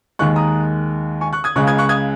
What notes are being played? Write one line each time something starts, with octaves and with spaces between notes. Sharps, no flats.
D#2 D#3 G#3 C#6 F#6
A#5 D#6
G#5 C#6
C#6 F#6
D#6 G#6
C#2 C#3 G#3 C#6 F#6
D#6 G#6
C#6 F#6
D#6 G#6